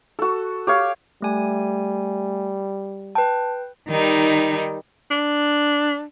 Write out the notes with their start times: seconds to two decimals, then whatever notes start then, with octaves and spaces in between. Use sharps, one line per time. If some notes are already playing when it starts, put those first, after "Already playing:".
0.19 F#4 A4
0.67 G4 C#5 F5
1.22 G3 A3 G#5
3.15 B4 G5 A5
3.89 D#3 G3 D#4
5.11 D4